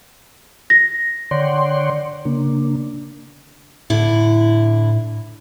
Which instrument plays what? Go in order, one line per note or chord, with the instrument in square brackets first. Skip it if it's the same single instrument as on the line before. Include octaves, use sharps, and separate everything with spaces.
[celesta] A#6
[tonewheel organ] D3 C#5 D5 F#5 G5 C6
C#3 A#3 D4
[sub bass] A2 [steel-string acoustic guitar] D3 E4